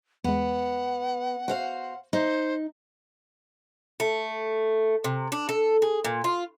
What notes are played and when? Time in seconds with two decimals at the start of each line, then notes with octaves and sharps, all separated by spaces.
0.24 E2 G#3 B3 F#5
1.48 F#4 C5 F5
2.13 D#4 C5
4.00 A3
5.04 C3
5.32 D4
5.49 A4
5.82 G#4
6.04 A#2
6.24 F4